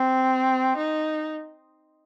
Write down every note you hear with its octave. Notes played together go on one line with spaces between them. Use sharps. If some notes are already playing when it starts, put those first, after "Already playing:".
Already playing: C4
D#4